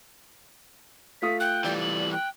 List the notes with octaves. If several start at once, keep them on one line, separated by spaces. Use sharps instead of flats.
A3 F4 D#6 B6
G5 F#6
E3 G3 D5
F#7
G5 F#6